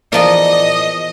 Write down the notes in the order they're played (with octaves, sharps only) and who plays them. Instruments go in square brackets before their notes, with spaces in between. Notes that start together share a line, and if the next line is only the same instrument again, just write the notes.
[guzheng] E2 F3 A#4 [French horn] D5 [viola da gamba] D#5